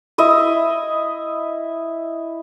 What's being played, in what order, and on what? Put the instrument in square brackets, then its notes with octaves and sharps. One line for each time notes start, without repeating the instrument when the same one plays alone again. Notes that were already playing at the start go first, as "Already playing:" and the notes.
[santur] E4 D#5 E5